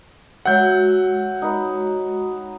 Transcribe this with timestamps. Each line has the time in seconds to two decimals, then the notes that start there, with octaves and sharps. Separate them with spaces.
0.46 F#3 G#3 F#4 E5 F#5 G6
1.42 D#4 B4